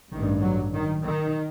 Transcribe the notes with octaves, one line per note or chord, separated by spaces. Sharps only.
A1 G2 D#3
F#3
D#3
D#3